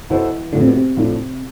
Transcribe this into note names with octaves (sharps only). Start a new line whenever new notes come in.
B2 E3 B3 E4 A4 C5
A2 D3 F3 A3 D4
C3
B2
C3
A2 F3 A3 D4